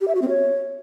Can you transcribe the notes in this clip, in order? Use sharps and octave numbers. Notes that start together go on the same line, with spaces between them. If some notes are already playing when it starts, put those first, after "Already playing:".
G4
E5
F#4
C4
C#5